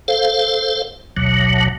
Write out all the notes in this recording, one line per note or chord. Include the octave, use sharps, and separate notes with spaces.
A4 C5 F5
A1 D2 B2 F#3